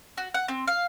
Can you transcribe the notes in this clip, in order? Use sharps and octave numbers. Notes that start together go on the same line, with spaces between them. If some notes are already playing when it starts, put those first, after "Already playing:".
F#4
F#5
C4
F5